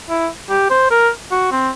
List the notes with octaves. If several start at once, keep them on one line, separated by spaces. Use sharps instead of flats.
E4
G4
C5
A#4
F#4
C4